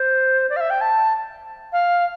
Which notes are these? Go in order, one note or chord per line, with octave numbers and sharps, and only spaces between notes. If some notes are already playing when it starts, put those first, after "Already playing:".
Already playing: C5
D5
F5
E5
G5
A5
F5